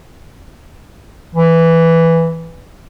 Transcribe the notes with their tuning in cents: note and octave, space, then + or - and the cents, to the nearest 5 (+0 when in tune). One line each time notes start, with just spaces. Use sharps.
E3 +5